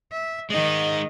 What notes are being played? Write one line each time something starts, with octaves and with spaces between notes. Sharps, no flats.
E5
D#3 G#3 D#4 D#5